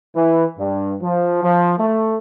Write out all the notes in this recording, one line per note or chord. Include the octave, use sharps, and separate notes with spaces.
E3
G2
F3
F3
A3